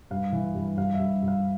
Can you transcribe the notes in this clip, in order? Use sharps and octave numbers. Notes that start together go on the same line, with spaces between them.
G2 F5
E3
G2
G2 F5
E5
G2
G2
F5